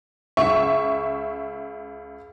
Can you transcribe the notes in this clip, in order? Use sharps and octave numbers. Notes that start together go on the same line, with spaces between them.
C#2 E5 C#6